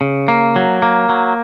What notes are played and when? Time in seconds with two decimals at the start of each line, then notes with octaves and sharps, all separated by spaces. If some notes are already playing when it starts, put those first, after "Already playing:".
0.01 C#3
0.28 A#3
0.56 F#3
0.82 A#3
1.09 F#3